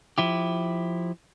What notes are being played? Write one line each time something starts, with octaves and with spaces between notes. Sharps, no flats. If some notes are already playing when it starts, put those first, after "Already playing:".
F3 E4 G4